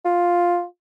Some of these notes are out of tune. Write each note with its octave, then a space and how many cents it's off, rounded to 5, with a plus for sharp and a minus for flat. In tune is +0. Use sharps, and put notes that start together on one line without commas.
F4 +5